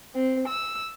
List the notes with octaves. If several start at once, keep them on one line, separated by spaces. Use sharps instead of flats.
C4
E6